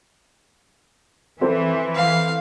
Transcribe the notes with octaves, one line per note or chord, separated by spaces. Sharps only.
E3 C4 A4 C5
F5